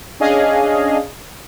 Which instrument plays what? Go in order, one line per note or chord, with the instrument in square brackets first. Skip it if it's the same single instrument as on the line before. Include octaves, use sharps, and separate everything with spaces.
[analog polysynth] C#4 D4 G#4 D#5 F5